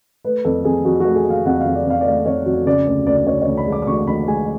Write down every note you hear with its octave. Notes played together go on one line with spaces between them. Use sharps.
A3 B4
F2 A4
F2 G#4
F2 F#4
A3 F#4
G#4
A3
F5
F2 F#5
F2 F5
D5
F2 F5
D5
A3 F5
F2 C#5
F2 F#4
C#3 D5
D2 D5
D2 D5
D5
D2 C#5
C#5
D2
B5
G#3 D6
D6
D2 C#6
D2 B5
G#3 G#5